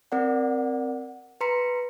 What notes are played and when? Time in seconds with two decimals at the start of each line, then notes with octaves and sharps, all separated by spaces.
0.12 C4 A#4 D5 F#5
1.41 B4 A#5 C6 B6 C#7